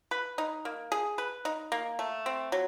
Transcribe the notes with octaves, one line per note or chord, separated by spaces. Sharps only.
B4
D#4
A#3
G#4
B4
D#4
A#3
A3
C4
F#3